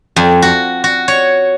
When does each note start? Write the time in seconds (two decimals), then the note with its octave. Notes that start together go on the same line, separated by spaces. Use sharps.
0.16 F2
0.42 F#4
0.84 F#4
1.08 C#5